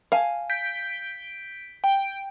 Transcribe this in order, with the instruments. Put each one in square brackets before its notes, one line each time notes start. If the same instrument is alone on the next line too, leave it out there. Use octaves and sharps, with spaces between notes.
[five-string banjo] F5 G#5 A5
[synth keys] G6 B6 D7
G5